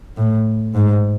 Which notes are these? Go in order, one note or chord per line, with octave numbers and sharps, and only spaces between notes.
A2
G#2